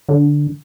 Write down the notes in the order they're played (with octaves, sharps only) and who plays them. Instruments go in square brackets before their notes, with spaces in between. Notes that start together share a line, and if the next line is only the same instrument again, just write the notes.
[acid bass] D3